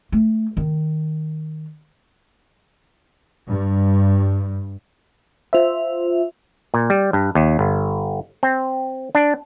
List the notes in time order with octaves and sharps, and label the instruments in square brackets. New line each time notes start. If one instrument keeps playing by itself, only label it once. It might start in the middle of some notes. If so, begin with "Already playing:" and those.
[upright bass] A3
D#3
[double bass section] G2
[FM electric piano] F4 C5 E5
[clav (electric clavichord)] A#2
G3
G2
D#2
G1
C4
D4